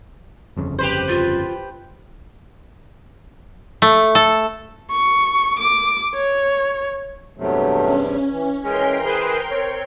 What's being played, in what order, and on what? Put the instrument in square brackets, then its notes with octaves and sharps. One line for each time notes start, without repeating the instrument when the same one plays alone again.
[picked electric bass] G1 F2 C#3
[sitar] G4 B4 C5
[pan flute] F4
[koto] A3
A4
[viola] C#6
D6
C#5
[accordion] E2 G2 C3 [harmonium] F#3 A3
[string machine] C#4
[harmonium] E3
[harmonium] E3 [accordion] G#3 C#4 [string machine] A#4 G5 C6
[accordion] G#4 B4 C5
C4 C#5